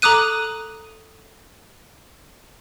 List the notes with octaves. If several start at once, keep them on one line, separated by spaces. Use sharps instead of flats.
A4 A#5 D6 D#6 F#6 D#7